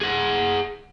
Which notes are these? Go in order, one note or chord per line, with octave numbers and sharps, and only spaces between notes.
G#4 F#5